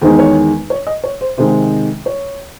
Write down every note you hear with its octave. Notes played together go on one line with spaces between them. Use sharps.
E2 D#3 G#3 D#4 C5
C#5
C#5
D#5
C#5
C5
C3 D#3 G#3 C5
C#5